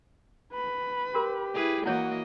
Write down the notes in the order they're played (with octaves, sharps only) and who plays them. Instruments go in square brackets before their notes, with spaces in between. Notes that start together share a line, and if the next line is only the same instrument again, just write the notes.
[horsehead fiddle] B4 B5
[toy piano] F#4 A#4 [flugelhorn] G4
[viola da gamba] E4 G#4 B4
[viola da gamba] E3 A#3 D#5 [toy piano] E4 C#5 [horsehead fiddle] F#4 [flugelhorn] F#5